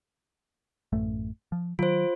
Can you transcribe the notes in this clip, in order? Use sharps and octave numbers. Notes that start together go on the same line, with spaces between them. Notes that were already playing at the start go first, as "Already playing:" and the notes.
A1 F#2 A3
F3
D#3 F#3 F4 C5